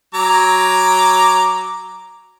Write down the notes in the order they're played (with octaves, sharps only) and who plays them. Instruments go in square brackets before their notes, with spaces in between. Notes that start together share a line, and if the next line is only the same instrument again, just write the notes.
[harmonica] F#3 A#5 D6